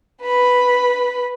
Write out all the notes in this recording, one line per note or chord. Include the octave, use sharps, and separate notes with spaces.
B4 B5